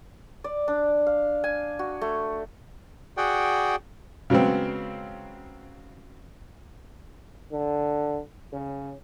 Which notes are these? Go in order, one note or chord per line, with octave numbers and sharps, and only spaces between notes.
D5
D4
F5
G#5
F#4
A3
F#4 G#4 D5 F#5 G5
C#3 F#3 G#3 B3 C4
D3
C#3